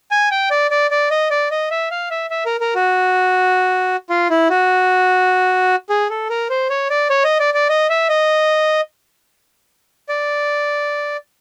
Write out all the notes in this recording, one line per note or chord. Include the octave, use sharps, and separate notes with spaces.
G#5
G5
D5
D5
D5
D#5
D5
D#5
E5
F5
E5
E5
A#4
A#4
F#4
F4
E4
F#4
G#4
A4
A#4
C5
C#5
D5
C#5
D#5
D5
D5
D#5
E5
D#5
D5